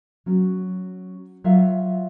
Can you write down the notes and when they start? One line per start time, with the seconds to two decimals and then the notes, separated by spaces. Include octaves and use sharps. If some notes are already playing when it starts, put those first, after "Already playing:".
0.26 F#3 C#4
1.44 F#3 F4 E5 F5